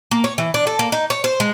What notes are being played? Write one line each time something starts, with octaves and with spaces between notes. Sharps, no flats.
A#3
C#5
E3
D4
A4
A#3
D#4
C#5
C5
G#3